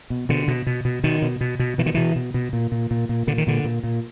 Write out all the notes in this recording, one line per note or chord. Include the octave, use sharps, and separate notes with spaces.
B2
B2 D3
B2
B2
B2
B2 D#3
B2
B2
B2
B2 E3
D#3
B2 E3
B2
B2
A#2
A#2
A#2
A#2
A#2 D3
D#3
A#2 D3
A#2
A#2